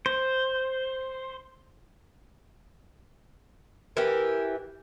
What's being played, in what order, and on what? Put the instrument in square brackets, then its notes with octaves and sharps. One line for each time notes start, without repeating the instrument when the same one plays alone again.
[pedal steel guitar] C5
[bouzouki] E3 G4 [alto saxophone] A#4